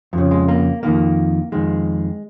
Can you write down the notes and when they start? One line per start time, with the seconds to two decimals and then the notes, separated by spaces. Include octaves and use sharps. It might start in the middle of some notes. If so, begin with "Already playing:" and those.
0.13 F2 C#3
0.31 G#3
0.48 A#3
0.83 F2 D#3 A#3
1.52 F2 D#3 G#3